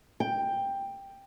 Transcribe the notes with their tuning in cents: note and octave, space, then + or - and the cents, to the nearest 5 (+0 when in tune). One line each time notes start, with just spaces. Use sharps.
G5 +10